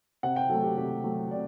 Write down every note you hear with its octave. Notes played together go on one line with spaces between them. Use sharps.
C3 F#5
G5
F#3 A3 A4
G4
C3 G4
F#3 A3
C3 D5